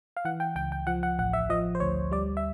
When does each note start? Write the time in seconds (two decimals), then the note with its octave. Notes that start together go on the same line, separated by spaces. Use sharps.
0.17 F5
0.25 E3 F#5
0.40 G5
0.55 C#2 G5
0.72 G5
0.87 F3 F#5
1.03 F#5
1.19 A1 F#5
1.33 E5
1.49 F3 D#5
1.75 C5
1.80 D2 C#5
2.11 G3 D5
2.37 E5